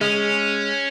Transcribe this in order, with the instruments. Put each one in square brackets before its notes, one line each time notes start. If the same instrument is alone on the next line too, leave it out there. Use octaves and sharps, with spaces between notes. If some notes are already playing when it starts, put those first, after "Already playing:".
[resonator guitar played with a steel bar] G#3 [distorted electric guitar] C#4